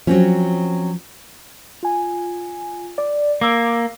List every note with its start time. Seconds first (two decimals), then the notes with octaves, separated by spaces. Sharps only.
0.07 F3 F#3 C4 C#4
1.83 F4 G#5
2.98 D5
3.41 A#3 D6 E6